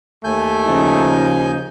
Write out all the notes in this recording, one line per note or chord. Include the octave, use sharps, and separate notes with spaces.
D#2 A3 G#5 G6
C#3 F3 D#4